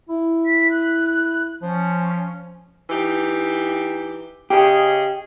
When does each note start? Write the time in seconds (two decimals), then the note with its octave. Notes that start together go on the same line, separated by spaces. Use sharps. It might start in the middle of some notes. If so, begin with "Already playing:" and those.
0.09 E4
0.46 B6
0.70 F#6
1.62 F3 C#4
2.90 E3 D#4 G4
4.50 C#3 G4 G#4 D#5